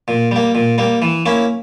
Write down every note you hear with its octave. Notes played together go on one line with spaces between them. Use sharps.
A#2
G3 A#3
A#2
G3 A#3
E3
A#3 C#4 E4